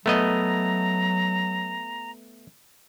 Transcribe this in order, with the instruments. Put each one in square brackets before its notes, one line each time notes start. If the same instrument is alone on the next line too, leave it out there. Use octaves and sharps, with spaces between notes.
[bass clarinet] F#3 [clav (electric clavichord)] A3 B3 D#5 [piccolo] A#5